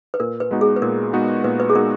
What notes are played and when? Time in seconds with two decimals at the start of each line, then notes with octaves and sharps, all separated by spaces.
0.14 B4
0.20 A#2 A#4
0.40 B4
0.51 G#3 B3 D#4 F#4
0.61 G#4
0.76 B4
0.82 A#2 A#4
1.13 G#3 B3 D#4 F#4
1.44 A#2 B4
1.60 B4
1.69 G#4
1.75 G#3 B3 D#4 F#4 A#4